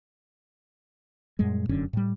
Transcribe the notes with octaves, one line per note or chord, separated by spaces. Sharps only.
F#2 A#2 G3 G#3
F1 F#2 D3 C#4
A2 G3